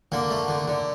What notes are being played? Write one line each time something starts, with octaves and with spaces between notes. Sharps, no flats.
D3 A#3
A3
D3
D3